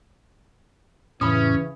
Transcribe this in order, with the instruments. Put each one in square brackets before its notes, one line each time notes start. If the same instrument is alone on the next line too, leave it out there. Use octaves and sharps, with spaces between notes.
[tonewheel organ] F2 A2 [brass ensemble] C#3 E3 [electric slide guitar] C#4 [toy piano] B5 D#6